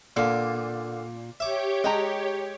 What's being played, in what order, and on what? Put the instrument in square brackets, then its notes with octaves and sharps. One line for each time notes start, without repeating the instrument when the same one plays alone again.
[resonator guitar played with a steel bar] A#2 [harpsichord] D3 A#3
[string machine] G4 C#5 [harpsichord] E5 D6
[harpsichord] G#3 [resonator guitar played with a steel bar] D#5 G5 A#5